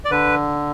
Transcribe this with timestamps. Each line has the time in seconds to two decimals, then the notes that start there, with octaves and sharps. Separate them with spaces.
0.05 D5
0.10 D3 B4